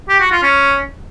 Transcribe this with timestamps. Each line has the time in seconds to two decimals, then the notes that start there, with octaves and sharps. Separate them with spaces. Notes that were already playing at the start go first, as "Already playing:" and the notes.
0.09 G4
0.20 F#4
0.31 F4
0.43 C#4